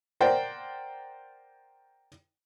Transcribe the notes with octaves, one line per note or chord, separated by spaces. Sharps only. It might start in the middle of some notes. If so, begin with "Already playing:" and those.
A#4 C5 D5 F#5 G5